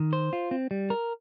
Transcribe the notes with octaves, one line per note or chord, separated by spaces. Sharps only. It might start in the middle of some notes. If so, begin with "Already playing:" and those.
Already playing: D#3
C5
F4
C4
G3
A#4